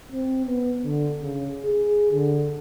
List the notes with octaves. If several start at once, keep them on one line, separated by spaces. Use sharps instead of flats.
C4
B3
D3
C#3
G#4
D3